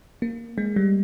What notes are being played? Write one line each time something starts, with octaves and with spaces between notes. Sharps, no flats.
A#3
G#3
G3